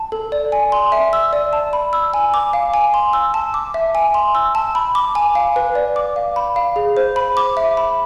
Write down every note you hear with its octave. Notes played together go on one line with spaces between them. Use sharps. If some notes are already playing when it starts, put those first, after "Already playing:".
Already playing: A5
A4
D5
G#5
C6
E5
E6
D5
A5
B5
E6
G#5
D6
F5
G#5
C6
E6
A5
D6
E5
G#5
C6
E6
A5
B5
D6
G#5
F5
B4
D5
D6
F5
B5
F5
G#4
C5
B5
D6
E5
B5